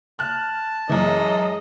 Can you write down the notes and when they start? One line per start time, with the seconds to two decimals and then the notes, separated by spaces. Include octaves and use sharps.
0.19 A5 F6 F#6
0.89 F#2 E3 G#3 D#5